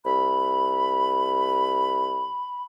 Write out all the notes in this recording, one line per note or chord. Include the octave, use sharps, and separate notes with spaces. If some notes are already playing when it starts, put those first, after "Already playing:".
C2 B5